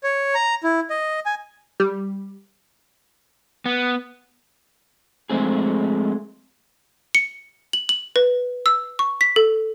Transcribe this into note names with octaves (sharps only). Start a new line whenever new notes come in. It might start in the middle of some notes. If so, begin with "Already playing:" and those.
C#5
A#5
E4
D#5
G#5
G3
B3
F3 G#3 A3 C4 G#4
C#7
F#7
F#7
B4
E6
C#6
B6
A4